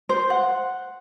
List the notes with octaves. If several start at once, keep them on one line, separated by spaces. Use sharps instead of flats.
C5
F#5